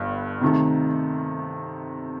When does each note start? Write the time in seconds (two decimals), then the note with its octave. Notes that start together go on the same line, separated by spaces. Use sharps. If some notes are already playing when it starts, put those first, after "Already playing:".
Already playing: G1 G2
0.41 C3 D#3 A3